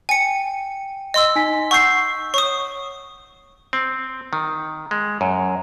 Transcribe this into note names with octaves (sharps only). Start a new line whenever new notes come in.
G5 G#5 C#7
D#5 C6 E6
D#4 G#5 B6
F#5 C#6 E6 G6 C7
C#5 C#6 D#6
C4
D#3
G#3
F#2